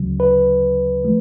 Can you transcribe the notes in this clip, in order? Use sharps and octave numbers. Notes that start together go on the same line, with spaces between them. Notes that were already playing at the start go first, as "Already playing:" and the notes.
Already playing: D2 C#3 F#3
B4
F3 A3